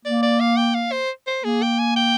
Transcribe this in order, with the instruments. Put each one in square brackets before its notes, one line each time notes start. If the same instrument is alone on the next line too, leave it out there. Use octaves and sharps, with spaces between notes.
[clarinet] A#3 [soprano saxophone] D5
[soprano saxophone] D5
F5
G5
F5
C5
C5
[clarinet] A#3 [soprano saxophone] G#4
[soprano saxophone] G5
G#5
G5